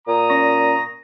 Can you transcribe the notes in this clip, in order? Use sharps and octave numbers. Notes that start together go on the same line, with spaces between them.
A#2 A#5 D#6
C#4 D5 C#6 A#6